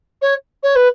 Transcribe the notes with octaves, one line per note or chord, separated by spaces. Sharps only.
C#5
C#5
B4